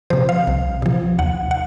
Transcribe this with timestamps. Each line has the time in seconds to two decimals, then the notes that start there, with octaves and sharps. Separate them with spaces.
0.10 C3 F3 C5
0.29 F5
0.47 C2
0.82 C3 F3
1.19 D#2 F#5
1.51 F#5